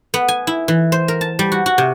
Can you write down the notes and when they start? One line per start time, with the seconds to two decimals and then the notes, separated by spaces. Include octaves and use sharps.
0.14 B3
0.28 G#5
0.47 E4
0.68 E3
0.92 C5
1.08 A#4
1.21 A5
1.39 G3
1.52 F#4
1.66 F#4
1.78 C3